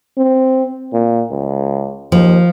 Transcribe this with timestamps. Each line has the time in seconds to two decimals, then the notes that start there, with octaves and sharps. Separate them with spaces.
0.18 C4
0.93 A#2
1.31 C#2
2.12 D#2 F3